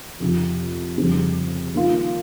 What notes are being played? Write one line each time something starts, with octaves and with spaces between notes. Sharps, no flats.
F2 C3 F3
F2 C#3 G3 C4
D#3 A#3 F4